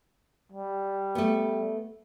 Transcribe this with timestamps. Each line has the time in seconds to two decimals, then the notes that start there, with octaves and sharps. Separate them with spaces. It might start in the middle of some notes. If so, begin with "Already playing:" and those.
0.52 G3
1.15 A3 B3